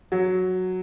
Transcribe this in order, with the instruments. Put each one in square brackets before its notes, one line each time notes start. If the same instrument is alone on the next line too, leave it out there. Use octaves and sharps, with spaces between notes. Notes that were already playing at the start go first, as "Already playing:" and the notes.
[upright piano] F#3